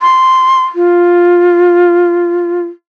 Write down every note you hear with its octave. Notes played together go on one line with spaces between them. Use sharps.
C6
F4